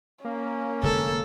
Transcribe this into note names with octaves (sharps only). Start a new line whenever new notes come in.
A#3 C#4
F1 D3 G#3 A4